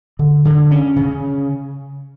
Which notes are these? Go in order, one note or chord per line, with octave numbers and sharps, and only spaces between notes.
D3
D3
C#4
C#3